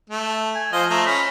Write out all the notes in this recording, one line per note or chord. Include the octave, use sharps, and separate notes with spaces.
A3
G#5
F3 C5 D#5 F5
A3 F4 A#5
C#4 B5